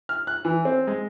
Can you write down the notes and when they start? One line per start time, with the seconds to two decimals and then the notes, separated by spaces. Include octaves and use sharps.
0.09 F6
0.27 F#6
0.45 E3
0.65 C4
0.87 G#3